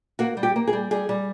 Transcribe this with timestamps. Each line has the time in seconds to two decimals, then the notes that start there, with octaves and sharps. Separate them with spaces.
0.19 A#3 F#4
0.37 G3
0.43 G4
0.56 A#3
0.67 G#4
0.73 G3
0.91 G3 G#4
1.09 G3